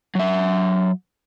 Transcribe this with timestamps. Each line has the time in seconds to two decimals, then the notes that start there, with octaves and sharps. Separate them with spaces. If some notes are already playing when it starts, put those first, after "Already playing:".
0.15 F#3 E5